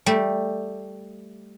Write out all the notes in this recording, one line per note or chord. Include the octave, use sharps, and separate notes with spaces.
G3 A3